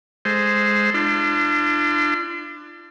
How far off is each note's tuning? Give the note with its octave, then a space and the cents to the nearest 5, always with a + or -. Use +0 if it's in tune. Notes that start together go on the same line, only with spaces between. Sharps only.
G#3 +0 A4 +0 C5 -5
D4 +20 F4 -40 C6 -35